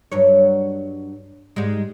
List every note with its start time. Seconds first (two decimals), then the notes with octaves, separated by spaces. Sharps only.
0.12 G2 F#3 C#5
1.56 G#2 G3 G#3